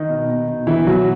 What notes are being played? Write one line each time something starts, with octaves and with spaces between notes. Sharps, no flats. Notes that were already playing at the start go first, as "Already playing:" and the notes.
Already playing: D#3 D#4
B2
B2
B2
B2 E3 E4
B2 F#3 F#4